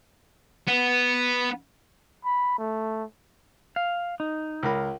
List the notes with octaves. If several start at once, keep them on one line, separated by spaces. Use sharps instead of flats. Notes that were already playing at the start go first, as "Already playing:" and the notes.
B3
B5
A3
F5
D#4
C#2 A#4 B5